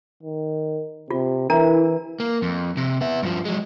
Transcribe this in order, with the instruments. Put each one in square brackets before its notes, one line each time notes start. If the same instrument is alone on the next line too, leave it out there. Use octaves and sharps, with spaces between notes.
[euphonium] D#3
[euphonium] C3 [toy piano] F4
[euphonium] E3 [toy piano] D4 A#4 A#5 [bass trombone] E4
[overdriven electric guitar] A#3
F2
C3
B3 E5
G2 F3
F#3 G#3